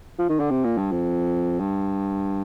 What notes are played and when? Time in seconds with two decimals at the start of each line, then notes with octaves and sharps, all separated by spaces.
0.19 F3
0.29 D#3
0.40 D3
0.50 C3
0.64 A#2
0.78 G2
0.91 F2
1.60 G2